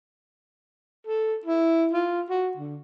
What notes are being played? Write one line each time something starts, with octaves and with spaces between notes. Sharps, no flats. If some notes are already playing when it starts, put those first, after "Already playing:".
A4
E4
F4
F#4
D3